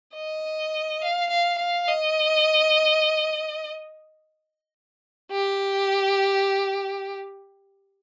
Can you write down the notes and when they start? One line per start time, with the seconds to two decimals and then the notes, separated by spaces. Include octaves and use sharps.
0.15 D#5
1.01 F5
1.30 F5
1.58 F5
1.88 D#5
5.31 G4